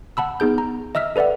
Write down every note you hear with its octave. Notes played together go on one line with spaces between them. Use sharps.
F#5 A5 B5 E6
B3 D#4 G#4 G6
A#5
D#5 E5 E6 F6 B6
A4 B4 D5 E5 F#5